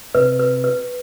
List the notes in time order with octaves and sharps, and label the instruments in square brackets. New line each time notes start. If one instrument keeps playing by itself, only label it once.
[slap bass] C3 [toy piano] B4
[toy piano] B4
B4